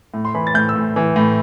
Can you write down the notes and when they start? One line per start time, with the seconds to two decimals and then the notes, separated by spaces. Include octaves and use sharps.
0.14 A2
0.25 C6
0.34 E3 B5
0.47 A6
0.54 A2 G6
0.69 E6
0.76 A2
0.96 E3
1.16 A2